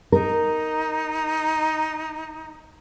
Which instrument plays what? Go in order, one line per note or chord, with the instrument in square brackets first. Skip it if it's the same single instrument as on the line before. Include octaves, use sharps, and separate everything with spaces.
[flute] D#4 [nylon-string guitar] A#4